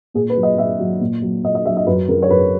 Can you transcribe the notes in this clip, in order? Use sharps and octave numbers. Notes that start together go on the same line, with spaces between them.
A#2 G#4
B4
F#3
D#5
A#2 E5
F#3
A#2
F#3
A#2 D#5
D#5
F#3 E5
D#5
F#2 B4
C#3 F#3 A#4
C#5
F#2 B4